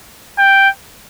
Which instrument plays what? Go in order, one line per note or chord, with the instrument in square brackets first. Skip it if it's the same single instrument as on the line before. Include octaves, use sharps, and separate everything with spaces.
[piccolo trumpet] G5